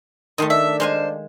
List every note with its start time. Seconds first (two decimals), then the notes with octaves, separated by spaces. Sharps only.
0.38 D#3 A3 D#5 C6
0.50 D4 E5
0.80 G#3 C5 F5 G#5